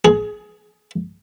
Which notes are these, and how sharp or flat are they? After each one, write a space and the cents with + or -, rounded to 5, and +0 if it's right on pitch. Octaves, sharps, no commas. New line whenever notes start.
G#4 +20